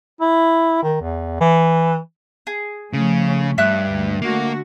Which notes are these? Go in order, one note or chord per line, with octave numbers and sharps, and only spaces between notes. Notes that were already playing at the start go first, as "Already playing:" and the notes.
E4
D#3
E2
E3
G#4
C#3 F3 A3 C#4
G2 E5 F#6
D2
D3 A3 A#3 F#4